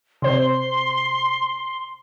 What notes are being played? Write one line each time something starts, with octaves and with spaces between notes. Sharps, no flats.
C3 C5 C6